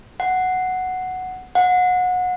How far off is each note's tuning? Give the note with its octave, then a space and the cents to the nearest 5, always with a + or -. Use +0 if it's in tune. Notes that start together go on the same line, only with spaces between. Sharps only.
F#5 +0
F#5 -25